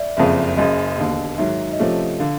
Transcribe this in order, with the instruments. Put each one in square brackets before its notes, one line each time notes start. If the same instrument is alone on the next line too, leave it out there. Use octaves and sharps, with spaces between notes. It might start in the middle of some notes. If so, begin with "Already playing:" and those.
Already playing: [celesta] D5 E5
[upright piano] F#1 F2 C#3 [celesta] E5
[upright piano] F#1 F#2 C#3 [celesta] D#5
[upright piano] E1 D#2 D3
[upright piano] G#2 D#3 F#3 [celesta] E5
[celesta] D#5
[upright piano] C3 F3 A3 C#4 [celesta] E5
[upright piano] D3 [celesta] F5